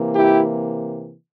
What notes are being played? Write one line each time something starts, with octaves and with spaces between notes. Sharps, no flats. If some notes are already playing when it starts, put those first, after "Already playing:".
Already playing: C3 E3 A#3
E4 G4